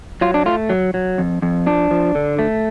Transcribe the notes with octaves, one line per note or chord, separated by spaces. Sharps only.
F#3 F4
D4
A3 F4
F#3
F#3
F2
F2
F3 D4
F3
D3
A3